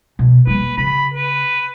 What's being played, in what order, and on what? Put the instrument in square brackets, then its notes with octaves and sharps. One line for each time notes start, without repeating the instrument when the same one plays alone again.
[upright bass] B2
[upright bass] G3 A#3 [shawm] B4
[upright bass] C#3 [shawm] B5
[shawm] B4